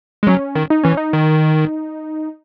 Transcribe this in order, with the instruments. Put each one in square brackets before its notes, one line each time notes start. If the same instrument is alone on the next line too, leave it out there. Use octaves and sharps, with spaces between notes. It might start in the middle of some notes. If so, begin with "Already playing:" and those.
[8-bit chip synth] G#3
[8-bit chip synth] F#3 [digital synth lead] C#4
[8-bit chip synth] D#3
[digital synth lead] D#4
[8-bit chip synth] E3 [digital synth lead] C#4
[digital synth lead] D#4
[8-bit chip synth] D#3